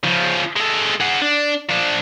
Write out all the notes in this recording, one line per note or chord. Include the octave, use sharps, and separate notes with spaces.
C#3 F3
G#3 A4
G#4 F#5
D4
F3 D4